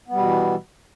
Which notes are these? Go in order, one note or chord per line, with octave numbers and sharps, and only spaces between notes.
B2 E3 G3 B3